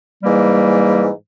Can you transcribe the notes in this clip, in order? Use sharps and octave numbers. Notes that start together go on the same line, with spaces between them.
G#2 E3 G3 A#3